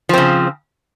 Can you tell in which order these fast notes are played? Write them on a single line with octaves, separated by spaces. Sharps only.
F3 C4 C#3